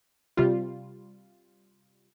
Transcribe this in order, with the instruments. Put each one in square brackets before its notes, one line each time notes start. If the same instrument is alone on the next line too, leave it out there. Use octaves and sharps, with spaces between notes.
[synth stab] C3 G3 F4